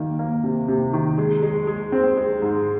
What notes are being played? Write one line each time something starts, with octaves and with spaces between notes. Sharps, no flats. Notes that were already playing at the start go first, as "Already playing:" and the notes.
Already playing: D#3 A#3
A#3
C3
C3
D#3
G#3
G#3
G#3
C4
G#3
G#2